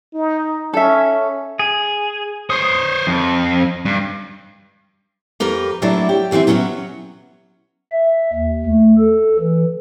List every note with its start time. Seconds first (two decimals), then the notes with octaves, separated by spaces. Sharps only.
0.14 D#4
0.74 C#4 A4 E5
1.59 G#4
2.50 C5 C#5 D#6
3.07 F2
3.85 G2
5.40 F2 G4 A#4 B4
5.82 F#3 G3 A3 A#3 D4 E4
6.09 G4
6.31 D#2 E3 F#3 C4 E5
6.47 F#3 B3 C#4 D4 F#4
7.92 E5
8.33 D#2
8.66 A3
8.98 A4
9.40 E3